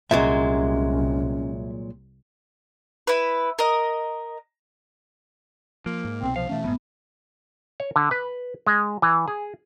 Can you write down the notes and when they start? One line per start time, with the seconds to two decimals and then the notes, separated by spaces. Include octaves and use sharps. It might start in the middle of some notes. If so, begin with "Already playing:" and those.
0.11 C2 A#2 F#3 G#3 C#4 E5
3.07 E4 B4
3.59 A#4 D#5
5.86 F3 A#3
6.05 G#2
6.22 C2 B2 C4
6.36 F3 F5
6.49 B2 E3 A3 C#4
6.64 F1 F2 G#2 B3
7.80 C#5
7.96 D3
8.11 B4
8.67 G#3
9.02 E3
9.28 G#4